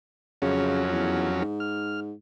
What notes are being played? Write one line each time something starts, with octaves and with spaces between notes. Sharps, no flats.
F2 C#3 F#3 C#4
E2
G#2
F6